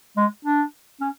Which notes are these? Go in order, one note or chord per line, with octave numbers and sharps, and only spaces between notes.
G#3
D4
C#4